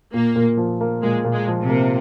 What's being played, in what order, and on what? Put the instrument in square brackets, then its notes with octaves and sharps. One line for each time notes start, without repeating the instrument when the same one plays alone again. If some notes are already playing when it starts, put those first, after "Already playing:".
[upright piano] A#2 [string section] A#3
[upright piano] A#2
F3
A#3
[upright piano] A#2 [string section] G#3
[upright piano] A#2
[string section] G#3
[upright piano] F3
[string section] C3
[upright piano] A#3